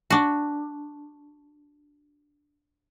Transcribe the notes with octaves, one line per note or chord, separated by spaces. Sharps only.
D4 F#4